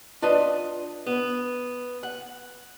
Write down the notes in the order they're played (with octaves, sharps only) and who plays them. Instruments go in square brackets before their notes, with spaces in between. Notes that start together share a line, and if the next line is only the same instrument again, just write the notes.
[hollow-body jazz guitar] D4 F4 B4 D5 D#5
B3
F#5